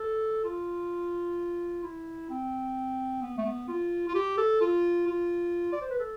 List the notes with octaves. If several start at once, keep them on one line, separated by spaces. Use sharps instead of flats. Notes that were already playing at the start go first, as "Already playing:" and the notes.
Already playing: A4
F4
E4
C4
B3
A3
B3
F4
F4
G4
A4
F4
F4
D5
C5
B4
A4